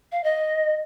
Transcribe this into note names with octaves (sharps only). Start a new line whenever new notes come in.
F5
D#5